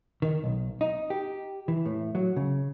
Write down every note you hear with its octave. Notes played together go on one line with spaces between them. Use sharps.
D#3
B1
D#4
G4
E3
A2
F#3
C#3